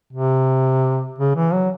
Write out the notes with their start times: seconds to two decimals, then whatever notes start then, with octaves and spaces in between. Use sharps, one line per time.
0.13 C3
1.19 C#3
1.36 E3
1.53 F#3